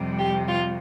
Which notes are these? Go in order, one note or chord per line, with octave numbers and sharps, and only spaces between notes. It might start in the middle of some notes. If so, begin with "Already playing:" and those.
Already playing: F2 C3 G3
G4
F4